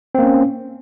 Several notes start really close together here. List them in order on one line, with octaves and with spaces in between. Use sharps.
C4 A#3 C#4